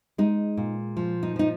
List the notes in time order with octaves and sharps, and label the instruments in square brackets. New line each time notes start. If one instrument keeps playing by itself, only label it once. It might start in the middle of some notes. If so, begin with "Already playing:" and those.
[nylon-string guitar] G#3 D#4
A#2
F3
D#4
F3 D#4